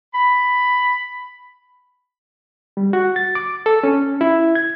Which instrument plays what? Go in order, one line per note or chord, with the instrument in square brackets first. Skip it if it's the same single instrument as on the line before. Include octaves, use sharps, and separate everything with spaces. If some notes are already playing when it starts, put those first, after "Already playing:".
[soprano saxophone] B5
[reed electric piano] G3
F#4
A6
D6
A4
C#4
E4
G#6